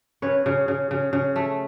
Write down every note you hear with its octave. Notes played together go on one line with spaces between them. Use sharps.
C#3 B4 C#5
C#3
C#3
C#3
C#3
A3